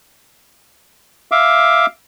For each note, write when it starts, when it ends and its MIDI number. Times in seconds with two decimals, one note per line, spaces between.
1.32 1.86 76
1.32 1.86 77
1.32 1.86 86